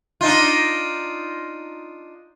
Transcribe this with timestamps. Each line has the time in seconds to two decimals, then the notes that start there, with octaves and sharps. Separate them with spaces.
0.21 D4 D#4 F4